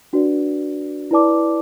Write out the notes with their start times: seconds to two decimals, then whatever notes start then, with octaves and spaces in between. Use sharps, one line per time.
0.13 D4 F#4 B4 D5
1.11 E4 B4 D5 A5 D6